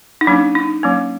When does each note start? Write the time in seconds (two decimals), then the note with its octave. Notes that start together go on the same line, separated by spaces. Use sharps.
0.21 D#4
0.27 F#3 A#3 C#4 D4
0.55 D#4
0.83 F#3 A#3 C#4